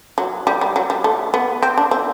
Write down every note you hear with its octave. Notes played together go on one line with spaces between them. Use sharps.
F#3
G3
G3
F#3
G3
A3
B3
C4
D4
C4